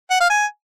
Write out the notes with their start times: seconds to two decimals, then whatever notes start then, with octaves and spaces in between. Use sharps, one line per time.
0.11 F#5
0.20 F5
0.30 G#5